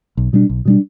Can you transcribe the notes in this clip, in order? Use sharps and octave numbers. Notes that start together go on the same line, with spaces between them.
B1
B2 G3 D4
B1
B2 G3 D4